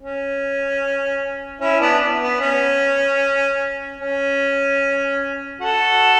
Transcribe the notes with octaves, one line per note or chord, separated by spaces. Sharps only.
C#4
C#4 E4
B3 D4
B3
C#4
C#4
F#4 A4